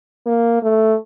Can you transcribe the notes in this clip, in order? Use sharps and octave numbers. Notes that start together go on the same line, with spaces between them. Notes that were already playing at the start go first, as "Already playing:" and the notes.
A#3
A3